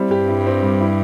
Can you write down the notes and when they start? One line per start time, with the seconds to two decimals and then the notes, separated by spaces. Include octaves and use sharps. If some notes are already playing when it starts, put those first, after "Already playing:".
Already playing: G3 C4 E4 G4
0.11 G2 G4
0.28 E4
0.46 C4
0.63 G3
0.81 E4